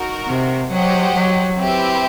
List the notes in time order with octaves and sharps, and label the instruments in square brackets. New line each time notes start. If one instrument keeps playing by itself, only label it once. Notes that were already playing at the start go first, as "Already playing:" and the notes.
Already playing: [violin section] D#4 F#4 A#4
[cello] C3
[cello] F#3 [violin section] G4 C5 D#5 F#5
[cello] F#3
[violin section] C4 E4 G4 B4 E5